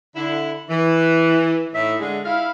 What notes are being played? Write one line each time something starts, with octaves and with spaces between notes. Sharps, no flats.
D3 E4
E3
A2 D#4 E5
D3 G#3
E4 F5